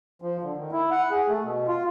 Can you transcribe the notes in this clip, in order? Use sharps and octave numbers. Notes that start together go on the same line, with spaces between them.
F3
D3
D#3
E4
F#5
G#4
A3
B2
F4